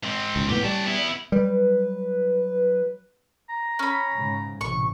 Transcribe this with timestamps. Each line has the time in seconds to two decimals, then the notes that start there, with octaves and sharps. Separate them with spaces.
0.03 G#2 C4
0.36 C#2
0.49 F1 B1 A2 B3 G4
0.64 G3 C#4 A5
0.85 B3 E4
1.32 F#3 G3 B4
3.50 A#5
3.79 C#4 B5
4.14 G#2 C#3
4.61 A1 C3 C#6